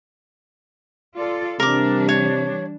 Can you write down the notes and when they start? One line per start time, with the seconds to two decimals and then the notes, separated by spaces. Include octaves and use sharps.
1.16 F4 A4 D5
1.60 C3 E3 G3 D4 A#4 D6
2.09 C#5